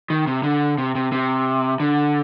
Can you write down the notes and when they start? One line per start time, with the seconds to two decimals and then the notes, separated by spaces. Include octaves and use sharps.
0.10 D#3
0.27 C3
0.43 D3
0.78 C3
0.95 C3
1.12 C3
1.80 D3